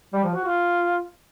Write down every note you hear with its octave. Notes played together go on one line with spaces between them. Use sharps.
G3
F3
F#4
F4